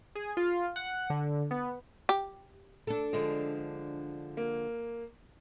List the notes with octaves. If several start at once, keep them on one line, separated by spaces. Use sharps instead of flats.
G#4
F4
F#5
D3
B3
G4
D4 A4
D3 F3 G#3
A#3